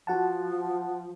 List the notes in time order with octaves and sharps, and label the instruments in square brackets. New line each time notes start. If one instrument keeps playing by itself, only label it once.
[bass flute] F3 [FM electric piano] F#4 F#5 A5